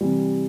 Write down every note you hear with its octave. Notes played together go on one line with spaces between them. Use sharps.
C3 E3 G3